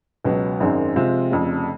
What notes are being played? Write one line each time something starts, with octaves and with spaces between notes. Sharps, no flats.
C#2 B2 F#3 B3
G#1 F#2 D#3 G#3 C4
C3 F3 G#3 C4 F4
F1 F2 C#3